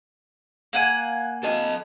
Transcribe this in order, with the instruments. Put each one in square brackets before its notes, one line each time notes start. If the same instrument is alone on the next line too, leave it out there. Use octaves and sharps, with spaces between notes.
[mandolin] A#3 F#5 G#5
[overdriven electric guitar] A4 D#5